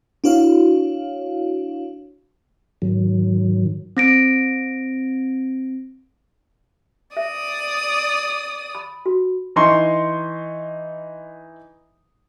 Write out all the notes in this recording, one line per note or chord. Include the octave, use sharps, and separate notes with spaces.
D4 E4 F#4 C#5 F5
G#2 D#3 F#3
C4 A#6 D7
D5 E5 D#6
B5
F#4
E3 D#4 C6 C#6